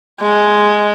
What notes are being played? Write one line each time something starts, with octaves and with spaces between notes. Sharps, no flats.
G#3